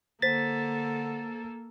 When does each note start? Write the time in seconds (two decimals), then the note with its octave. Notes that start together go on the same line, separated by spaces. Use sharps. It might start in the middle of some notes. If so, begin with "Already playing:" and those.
0.22 D3 A#3 A4 C5 A6 B6